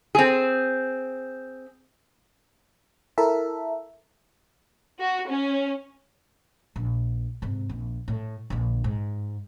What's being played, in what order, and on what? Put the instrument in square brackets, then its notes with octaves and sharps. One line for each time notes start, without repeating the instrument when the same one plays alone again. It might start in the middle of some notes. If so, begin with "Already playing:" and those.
[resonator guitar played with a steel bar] C4 G#4
[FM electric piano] E4 A4 A#4 E5
[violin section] F#4
C#4
[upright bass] A#1
G#2 C3
A#1
A2
A#1 D3
G#2